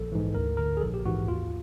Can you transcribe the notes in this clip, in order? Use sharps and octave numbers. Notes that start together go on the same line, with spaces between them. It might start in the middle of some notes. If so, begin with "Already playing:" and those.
Already playing: A#1 A4
G#2 E3
D2 A#4
D3 A#4
G#4
A#1 A4
G4
G#2 E3 F#4
D#2 F4